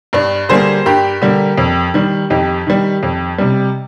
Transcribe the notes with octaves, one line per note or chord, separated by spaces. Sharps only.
G2 D4
D3 G3 A#3 G#4 C5
G2 G4 A#4
D3 G3 A#3
F2
D#3 G3
F2 D#4 G4
D#3 G3
F2
C3 G3